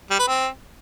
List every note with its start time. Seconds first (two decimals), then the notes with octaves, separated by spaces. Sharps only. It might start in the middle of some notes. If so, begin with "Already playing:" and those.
0.10 G3
0.19 B4
0.27 C4